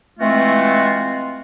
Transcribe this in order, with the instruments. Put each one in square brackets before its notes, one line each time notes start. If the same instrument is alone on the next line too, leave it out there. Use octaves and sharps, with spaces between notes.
[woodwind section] E3 G#3 A3 C4 F4 F#4